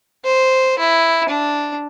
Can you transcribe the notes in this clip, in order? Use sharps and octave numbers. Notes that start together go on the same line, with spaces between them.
C5
E4
D4